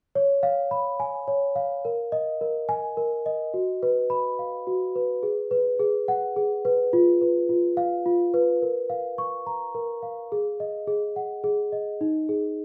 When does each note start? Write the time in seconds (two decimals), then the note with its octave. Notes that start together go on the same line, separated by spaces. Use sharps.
0.15 C#5
0.43 F5
0.71 B5
1.00 G#5
1.28 C#5
1.56 F5
1.85 A#4
2.12 D#5
2.41 A#4
2.69 G#5
2.97 A#4
3.26 D#5
3.54 F#4
3.83 B4
4.10 B5
4.39 F5
4.67 F#4
4.96 B4
5.23 G#4
5.51 B4
5.79 G#4
6.08 F#5
6.36 G#4
6.65 B4
6.93 F4
7.21 B4
7.49 F4
7.77 F5
8.06 F4
8.34 B4
8.62 A#4
8.90 F5
9.18 C#6
9.47 A#5
9.75 A#4
10.03 F5
10.32 G#4
10.60 D#5
10.87 G#4
11.16 F#5
11.44 G#4
11.72 D#5
12.01 D#4
12.29 G#4